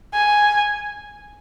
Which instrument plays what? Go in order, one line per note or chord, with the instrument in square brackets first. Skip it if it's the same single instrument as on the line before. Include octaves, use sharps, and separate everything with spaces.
[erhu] G#5